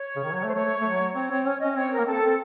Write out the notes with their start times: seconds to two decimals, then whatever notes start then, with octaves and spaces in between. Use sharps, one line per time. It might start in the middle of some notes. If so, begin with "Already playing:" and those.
Already playing: C#5
0.16 C#3
0.24 D#3
0.33 F#3
0.44 A3
0.48 C5
0.54 A3 C#5
0.64 A3
0.81 A3
0.84 F#3
1.15 C4 C#5
1.30 C4 C#5
1.46 C#4 C#5
1.61 C#4 D#5
1.72 D#5
1.76 C4 C#5
1.91 A#4
1.99 A#3
2.06 C4 A4
2.22 C4